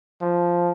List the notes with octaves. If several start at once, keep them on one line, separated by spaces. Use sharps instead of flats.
F3